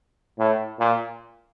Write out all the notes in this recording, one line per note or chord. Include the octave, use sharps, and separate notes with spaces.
A2
A#2